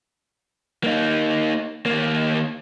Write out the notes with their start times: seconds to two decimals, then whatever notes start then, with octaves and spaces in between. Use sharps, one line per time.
0.84 A#3 D#4
1.86 D#2 A#3